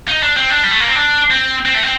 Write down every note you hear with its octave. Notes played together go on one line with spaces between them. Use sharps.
D#4
D4
C4
D4
G3
A3
A#3
C4
D4
C4
C4
A3
C4